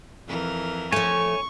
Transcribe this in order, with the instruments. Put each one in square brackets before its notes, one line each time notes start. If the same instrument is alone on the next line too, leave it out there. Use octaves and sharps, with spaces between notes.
[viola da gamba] F2 E3 A#4
[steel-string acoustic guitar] F3 A3 [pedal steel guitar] C#5 G#5 [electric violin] C#6